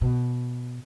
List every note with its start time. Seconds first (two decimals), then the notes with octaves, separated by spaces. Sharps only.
0.01 B2